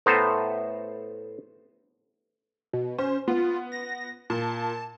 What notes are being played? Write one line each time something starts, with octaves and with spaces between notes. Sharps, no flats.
A2 A3 B3 C5 A5 A#5
B2
C#4 C5
B3 F4
A#6
A#2 A5